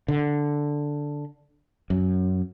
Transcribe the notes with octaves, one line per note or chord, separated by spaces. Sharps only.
D3
F#2